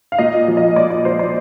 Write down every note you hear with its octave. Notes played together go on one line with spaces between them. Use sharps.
F5
A#2 D#5
F3
D#5
A#2 D5
D5
F3 C5
D5